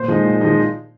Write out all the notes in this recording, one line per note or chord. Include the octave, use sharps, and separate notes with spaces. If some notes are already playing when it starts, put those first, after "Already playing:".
Already playing: A#2 C5 C6
F3 G#3 D#4
A#2
F3 G#3 D#4